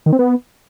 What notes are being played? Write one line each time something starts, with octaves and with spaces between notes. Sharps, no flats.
D#3
C4
B3